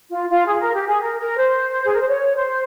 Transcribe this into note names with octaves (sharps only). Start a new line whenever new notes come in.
F4
F4
G#4
A#4
G4
G#4
A#4
A#4
C5
G#4
A#4
C5
C#5
C5